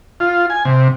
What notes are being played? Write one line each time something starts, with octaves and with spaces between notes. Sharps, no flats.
F4
G#5
C3